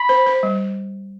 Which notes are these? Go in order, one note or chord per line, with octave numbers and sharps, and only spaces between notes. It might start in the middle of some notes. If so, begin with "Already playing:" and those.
Already playing: B5
C5
C5
G3